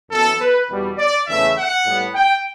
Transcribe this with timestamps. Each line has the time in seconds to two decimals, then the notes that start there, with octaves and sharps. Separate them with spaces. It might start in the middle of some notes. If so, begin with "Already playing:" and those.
0.11 F#2 E3 B3 A4
0.40 B4
0.69 E2 B2 G3 B3
0.98 D5
1.27 E2 C#3 E3 A3 E5
1.56 F#5
1.85 A2 G3 B3
2.14 G5